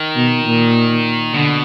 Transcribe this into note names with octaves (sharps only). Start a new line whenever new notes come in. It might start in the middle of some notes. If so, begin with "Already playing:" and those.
Already playing: D#3
B2
A#2
B2 D3